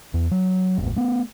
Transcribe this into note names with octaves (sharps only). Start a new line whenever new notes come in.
E2
F#3
E1 A1
A3 B3